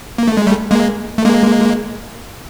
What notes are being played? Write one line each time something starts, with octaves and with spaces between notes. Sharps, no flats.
A#3
A3
G#3
G3 A3
G#3 A#3
A3
G#3 A#3